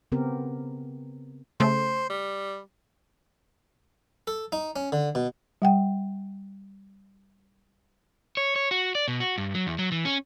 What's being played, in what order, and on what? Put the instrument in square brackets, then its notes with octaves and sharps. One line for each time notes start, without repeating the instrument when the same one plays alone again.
[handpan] C#3 B3 C4 G4 A#4
[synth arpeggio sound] C#3 A3 [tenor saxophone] C5
[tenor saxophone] G3
[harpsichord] A4
D#4
C#4
D3
B2
[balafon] G3 F#5 G5
[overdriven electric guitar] C#5
C#5
F#4
D5
B2
F#4
G2
F#3
E2
F#3
E3
C#4